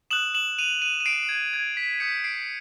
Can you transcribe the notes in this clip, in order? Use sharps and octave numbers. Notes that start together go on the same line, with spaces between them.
D#6 F#6 E7 F#7
E7 F#7
D#7 F7
D#7 F7
D#7
C7 D7
G#6
G#6
B6
D#6 G6 B6 C#7
C7 D7